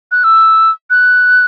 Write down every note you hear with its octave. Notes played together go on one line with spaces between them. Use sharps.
F#6
E6
F#6